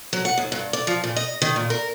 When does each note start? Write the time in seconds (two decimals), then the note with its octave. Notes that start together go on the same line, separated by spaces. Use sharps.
0.13 F#3
0.25 F#5
0.38 D#2
0.52 G2
0.73 D5
0.87 F3
1.04 A#2
1.16 D#5
1.42 D#3
1.56 A#2
1.70 A#4